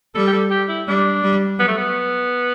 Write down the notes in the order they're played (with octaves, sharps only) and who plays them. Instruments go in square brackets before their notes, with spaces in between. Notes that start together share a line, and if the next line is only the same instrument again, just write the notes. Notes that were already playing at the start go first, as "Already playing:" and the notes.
[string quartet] G3 [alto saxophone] A4
[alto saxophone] G4
A4
G4
E4
[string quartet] G3 [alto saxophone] D4
[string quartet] G3
[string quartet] F#3 [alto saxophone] B3
[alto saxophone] A3
B3